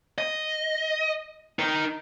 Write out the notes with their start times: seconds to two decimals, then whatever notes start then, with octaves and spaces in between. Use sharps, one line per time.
0.18 D#5
1.59 D#4 A#4